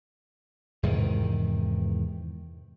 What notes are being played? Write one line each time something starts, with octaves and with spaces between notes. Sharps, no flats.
E2 G#2 C3 D#3